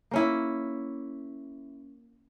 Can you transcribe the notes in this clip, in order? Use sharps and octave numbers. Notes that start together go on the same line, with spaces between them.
A#3 C#4 E4